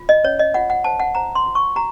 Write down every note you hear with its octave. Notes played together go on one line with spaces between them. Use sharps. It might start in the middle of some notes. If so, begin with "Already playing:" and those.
Already playing: F4
D#5
C#4 C#5
D#5
F4 F#5
F#5
C5 A5
F#5
C5 A#5
C6
F4
C#6
F#4 A#5